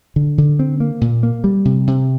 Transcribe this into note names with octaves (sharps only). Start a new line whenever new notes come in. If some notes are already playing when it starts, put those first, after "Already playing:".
D3
D3
C4
A#3
A#2
A#3
G3
C3
C3